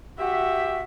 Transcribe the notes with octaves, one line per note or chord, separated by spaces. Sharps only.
F#4 G4 E5